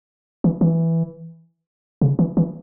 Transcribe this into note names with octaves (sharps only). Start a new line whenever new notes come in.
E3
E3
C#3
E3
E3